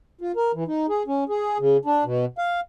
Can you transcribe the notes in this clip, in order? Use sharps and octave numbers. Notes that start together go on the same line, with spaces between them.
F4
A#4
E3
D#4
G#4
C#4
G#4
C#3
D4
B2
F5